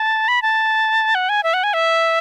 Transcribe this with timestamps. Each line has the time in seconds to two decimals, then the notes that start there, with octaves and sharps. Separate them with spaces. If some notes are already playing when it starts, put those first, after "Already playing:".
Already playing: A5
0.28 B5
0.42 A5
1.15 F#5
1.29 G#5
1.43 E5
1.54 F#5
1.63 G#5
1.74 E5